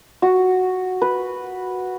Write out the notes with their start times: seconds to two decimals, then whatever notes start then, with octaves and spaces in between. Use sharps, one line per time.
0.22 F#4
1.02 B4